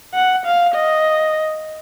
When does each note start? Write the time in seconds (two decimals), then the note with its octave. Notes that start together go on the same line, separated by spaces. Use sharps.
0.14 F#5
0.46 F5
0.75 D#5